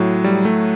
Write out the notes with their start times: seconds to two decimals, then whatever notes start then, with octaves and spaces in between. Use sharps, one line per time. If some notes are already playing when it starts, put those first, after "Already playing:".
Already playing: A2 F#3
0.24 G3
0.45 A3